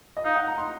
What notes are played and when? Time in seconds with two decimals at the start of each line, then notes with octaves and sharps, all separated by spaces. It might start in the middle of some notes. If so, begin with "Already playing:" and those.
0.17 D#5
0.24 D#4 F5
0.36 F#5
0.47 A#5
0.58 C6